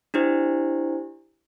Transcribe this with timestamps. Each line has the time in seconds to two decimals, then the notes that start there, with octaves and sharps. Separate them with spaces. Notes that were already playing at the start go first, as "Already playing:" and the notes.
0.14 D4 E4 G4 C5